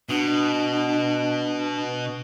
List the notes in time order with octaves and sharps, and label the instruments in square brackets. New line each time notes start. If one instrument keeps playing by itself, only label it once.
[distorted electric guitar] B2 [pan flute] D4